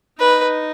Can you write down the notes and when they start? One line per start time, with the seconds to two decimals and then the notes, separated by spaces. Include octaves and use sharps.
0.19 D#4 B4